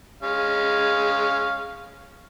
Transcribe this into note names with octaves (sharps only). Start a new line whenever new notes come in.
G#3 C#4 F5